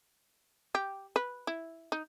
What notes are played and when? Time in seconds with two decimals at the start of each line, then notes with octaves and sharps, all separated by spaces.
0.75 G4
1.16 B4
1.47 E4
1.92 D#4